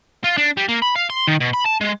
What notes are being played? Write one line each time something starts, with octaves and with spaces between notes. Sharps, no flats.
F4
D4
G3
A#3
B5
F5
C6
D#3
B2
B5
A5
G#3